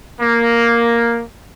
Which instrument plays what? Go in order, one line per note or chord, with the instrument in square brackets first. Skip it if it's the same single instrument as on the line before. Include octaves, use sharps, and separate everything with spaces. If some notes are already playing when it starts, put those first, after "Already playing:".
[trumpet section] A#3